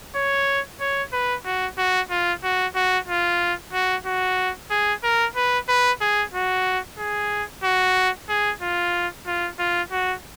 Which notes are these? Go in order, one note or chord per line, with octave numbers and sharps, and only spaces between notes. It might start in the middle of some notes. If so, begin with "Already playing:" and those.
C#5
C#5
B4
F#4
F#4
F4
F#4
F#4
F4
F#4
F#4
G#4
A#4
B4
B4
G#4
F#4
G#4
F#4
G#4
F4
F4
F4
F#4